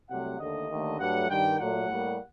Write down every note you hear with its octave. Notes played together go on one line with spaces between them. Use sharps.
C2 C3 F#3 A3 F#5
D#2 D3 A3 D#5
D#2 D3 A3
G2 F#3 A3 F#5
G2 D#3 G3 G5
A#2 F#3 A3 F#5
A2 G3 A#3